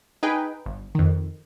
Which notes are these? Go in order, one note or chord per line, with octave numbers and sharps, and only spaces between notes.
D#4 G#4 B4 G5
G1
F2 D#3